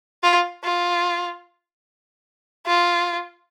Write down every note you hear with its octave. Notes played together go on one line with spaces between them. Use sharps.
F4
F4
F4